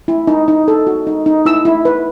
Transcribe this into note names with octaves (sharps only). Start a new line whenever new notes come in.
E4
D#4
D#4
A4
F#4
D#4
D#4
E4 E6
E4
B4